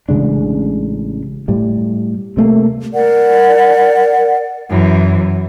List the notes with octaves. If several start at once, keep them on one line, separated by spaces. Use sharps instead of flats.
A1 C#3 G#3 D4
A2 G3
C3 A3 A#3
A#4 D5 F#5
F#2 E3